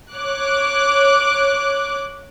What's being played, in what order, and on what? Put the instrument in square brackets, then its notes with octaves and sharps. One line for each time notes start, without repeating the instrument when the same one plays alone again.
[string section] C#5 D6 F#6